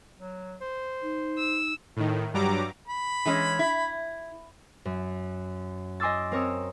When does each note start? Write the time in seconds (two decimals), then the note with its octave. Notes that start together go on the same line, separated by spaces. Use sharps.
0.19 F#3
0.61 C5
1.02 D#4
1.37 E6
1.96 A2 D#3
2.34 G2 F#3 G3 A#5 D6
2.88 B5
3.25 E3 G#3 C#4
3.59 E4
4.85 F#2
6.00 D#5 G#5 C6 D6 E6 A6
6.32 C4 A#4 C#5 D#6 E6